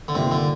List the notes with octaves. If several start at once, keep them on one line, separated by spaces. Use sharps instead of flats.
D3
G2 C3 D#3 A#3 F4
D3